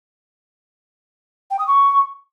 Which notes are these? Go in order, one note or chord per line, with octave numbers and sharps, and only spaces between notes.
G5
D#6
C#6